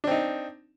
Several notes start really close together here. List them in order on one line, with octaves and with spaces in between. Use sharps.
D4 C4 D#4